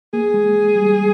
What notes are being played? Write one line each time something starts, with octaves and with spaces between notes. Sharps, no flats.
A#3 G#4
G#3
G3